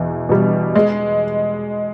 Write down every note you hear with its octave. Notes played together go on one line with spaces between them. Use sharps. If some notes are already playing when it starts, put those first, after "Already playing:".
Already playing: E2 B2
B2 G3
G#3